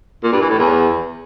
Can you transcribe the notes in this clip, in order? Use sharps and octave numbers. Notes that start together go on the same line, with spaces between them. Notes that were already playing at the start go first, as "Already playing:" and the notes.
A#2
G2
E3
A2
E2